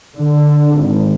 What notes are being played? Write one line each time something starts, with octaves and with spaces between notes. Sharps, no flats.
D3
G#1